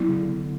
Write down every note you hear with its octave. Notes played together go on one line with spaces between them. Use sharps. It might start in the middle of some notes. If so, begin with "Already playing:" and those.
Already playing: F#3 B3 E4
C#3
D3